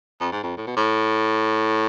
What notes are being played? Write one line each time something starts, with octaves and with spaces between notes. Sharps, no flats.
F2
G#2
F2
A2
B2
A2